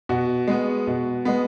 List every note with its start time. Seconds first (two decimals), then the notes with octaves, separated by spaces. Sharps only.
0.09 B2 F#4
0.48 G#3 B3
0.87 B2
1.25 G#3 B3